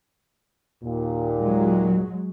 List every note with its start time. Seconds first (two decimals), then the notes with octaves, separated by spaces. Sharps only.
0.83 D#2 A#2
1.39 F#3 G#3